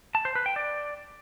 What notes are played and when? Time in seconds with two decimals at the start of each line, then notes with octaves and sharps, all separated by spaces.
0.15 A5
0.25 C5
0.35 B4
0.46 G5
0.56 D5